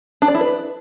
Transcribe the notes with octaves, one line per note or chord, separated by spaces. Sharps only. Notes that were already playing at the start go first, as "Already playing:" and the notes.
D4
D5
E4
B4